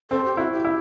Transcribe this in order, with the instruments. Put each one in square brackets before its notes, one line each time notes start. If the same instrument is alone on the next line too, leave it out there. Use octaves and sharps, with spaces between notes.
[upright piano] C4 [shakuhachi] A4
[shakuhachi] G4
[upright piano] E4 [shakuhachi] F#4
[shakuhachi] G4
[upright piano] E4